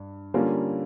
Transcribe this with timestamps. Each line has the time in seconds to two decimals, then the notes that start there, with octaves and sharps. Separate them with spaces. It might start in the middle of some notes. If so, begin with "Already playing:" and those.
Already playing: G2
0.34 D3 G3 A#3 C#4 F4